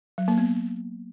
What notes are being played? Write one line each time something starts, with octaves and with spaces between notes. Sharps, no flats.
F#3
A#3
B3